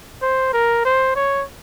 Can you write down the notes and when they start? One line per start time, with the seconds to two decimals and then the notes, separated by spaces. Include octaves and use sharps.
0.22 C5
0.53 A#4
0.85 C5
1.16 C#5